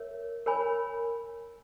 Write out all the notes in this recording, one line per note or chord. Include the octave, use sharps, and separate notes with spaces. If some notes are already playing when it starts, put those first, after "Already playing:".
Already playing: A#4 C#5 E5
A#4 C#5 G#5 B5